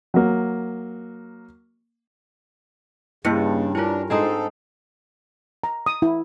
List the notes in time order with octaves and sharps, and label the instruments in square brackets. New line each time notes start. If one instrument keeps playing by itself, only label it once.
[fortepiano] F#3 A#3
[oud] G2 [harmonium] C#3 [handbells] A#3 E4 C#7
[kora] C#4 A#4 [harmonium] D4 [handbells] E4 F4
[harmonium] G#2 A4 [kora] G#3 C4 D#4
[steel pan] A#5
D#6
E4